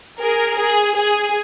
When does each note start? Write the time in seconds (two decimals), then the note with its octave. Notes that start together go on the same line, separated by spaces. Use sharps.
0.21 G#4 A#4
0.58 G#4
0.96 G#4